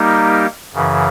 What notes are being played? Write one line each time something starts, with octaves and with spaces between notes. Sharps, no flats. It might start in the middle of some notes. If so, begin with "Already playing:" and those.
Already playing: G3 A#3 D#4 G4
F#2 C#3 E3